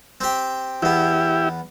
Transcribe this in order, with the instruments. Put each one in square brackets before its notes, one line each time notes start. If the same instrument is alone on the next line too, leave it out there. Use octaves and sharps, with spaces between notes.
[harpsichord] C4 G4
[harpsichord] E2 B3 [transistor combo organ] E4 G4